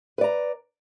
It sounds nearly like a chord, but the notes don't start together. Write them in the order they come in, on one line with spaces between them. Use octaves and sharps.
B4 D5 A#5